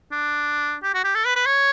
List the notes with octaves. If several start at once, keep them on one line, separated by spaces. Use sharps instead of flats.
D4
G4
F#4
G4
A4
B4
B4
C#5